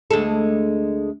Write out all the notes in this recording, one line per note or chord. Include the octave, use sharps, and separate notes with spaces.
D2 G#3 A4